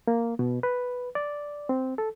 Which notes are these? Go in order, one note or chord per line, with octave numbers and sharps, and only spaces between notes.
A#3
B2
B4
D5
C4
A4